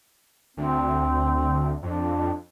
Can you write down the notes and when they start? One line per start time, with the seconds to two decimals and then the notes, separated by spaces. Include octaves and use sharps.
0.57 D2 C4
1.82 F2 D4